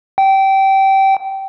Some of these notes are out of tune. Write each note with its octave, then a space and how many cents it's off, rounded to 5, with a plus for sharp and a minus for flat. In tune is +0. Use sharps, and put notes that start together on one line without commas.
G5 -20